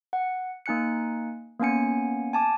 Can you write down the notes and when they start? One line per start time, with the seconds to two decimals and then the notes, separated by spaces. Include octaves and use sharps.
0.13 F#5
0.66 A#3 D#4 G#5 F#6 C#7
1.60 A#3 B3 C#4 G#5 C#7
2.33 G#5 A5 D6